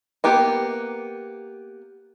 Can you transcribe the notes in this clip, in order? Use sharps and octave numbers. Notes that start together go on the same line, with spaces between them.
A#3 B3 G4